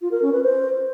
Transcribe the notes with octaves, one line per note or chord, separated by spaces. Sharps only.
F4
A#4
C#4
B4
C5